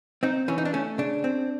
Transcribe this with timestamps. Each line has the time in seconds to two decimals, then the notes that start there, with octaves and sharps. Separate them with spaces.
0.23 C4 D#4
0.48 E3 C#4
0.58 D#4
0.65 D4
0.73 A3 C#4
0.98 C#3 D4
1.24 C4